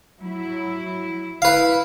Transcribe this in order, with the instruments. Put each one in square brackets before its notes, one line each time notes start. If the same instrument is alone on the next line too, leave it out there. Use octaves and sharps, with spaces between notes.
[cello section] F#3 E4
[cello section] E4 [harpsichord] B4 F5